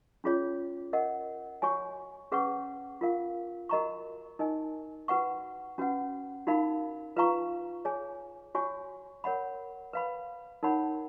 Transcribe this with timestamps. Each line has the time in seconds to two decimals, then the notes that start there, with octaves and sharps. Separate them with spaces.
0.24 C#4 F4 G#4 C#5
0.93 A#4 D#5 F#5
1.62 F#4 C#5 G#5 C#6
2.32 C#4 G#4 B4 F#5 C#6
3.01 F4 A#4 F5
3.69 F#4 A#4 D#5 A#5 C#6
4.39 D#4 A#4 D#5 G#5
5.08 F#4 B4 F#5 C#6
5.78 C#4 F#4 B4 F#5
6.47 D#4 F#4 A#4 F5 B5
7.16 F4 B4 F5 A#5 C#6
7.85 G#4 C#5 G#5
8.55 F#4 C#5 G#5 C#6
9.24 A#4 C#5 F#5 B5
9.93 B4 F5 B5
10.63 D#4 A#4 C#5 F#5 B5